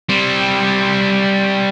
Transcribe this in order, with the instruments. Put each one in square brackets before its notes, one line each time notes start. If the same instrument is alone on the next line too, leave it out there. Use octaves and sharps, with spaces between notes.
[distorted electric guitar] G3 C4